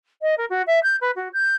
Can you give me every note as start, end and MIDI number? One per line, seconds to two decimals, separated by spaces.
0.21 0.34 75
0.37 0.45 70
0.49 0.62 66
0.66 0.79 76
0.83 0.96 91
1.00 1.11 71
1.15 1.28 66
1.33 1.55 91